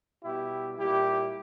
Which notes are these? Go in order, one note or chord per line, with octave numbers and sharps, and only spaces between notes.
B2 G3 E4 G4
A#2 G3 E4 G4